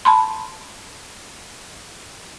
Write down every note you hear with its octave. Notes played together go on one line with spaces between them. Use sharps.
A5 B5 C6